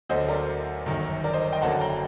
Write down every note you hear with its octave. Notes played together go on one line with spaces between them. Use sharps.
D2 D3 F#3 C5 D#5
A#4 D5
G1 F#2 D#3
A#4 D5
C5 D#5
D#5 G5
F#1 F#2 D3 F#3 A#3 F#5 A5
G5 A#5